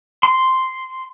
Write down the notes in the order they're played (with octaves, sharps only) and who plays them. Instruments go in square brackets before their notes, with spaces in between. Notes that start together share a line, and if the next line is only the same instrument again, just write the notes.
[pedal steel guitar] C6